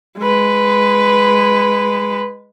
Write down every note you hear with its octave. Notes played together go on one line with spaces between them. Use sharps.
G#3 B4